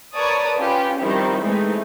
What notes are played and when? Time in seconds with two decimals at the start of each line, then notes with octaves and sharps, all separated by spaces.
0.14 A#4 B4 C#5 D5 A5 D#6
0.58 C#4 F4 G4 B4
0.99 D#3 F3 G3 C4 D#4 E4
1.41 E3 G#3 A3 C4 D#4